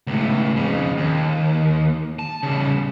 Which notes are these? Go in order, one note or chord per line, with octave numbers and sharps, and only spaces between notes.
C#2 A2
F2 C#3
D#2
A5
C#3 G3